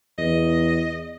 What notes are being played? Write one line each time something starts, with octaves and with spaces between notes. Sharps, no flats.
E2 D#5